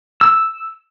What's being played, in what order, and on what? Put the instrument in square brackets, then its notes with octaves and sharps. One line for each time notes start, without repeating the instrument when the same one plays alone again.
[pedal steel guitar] E6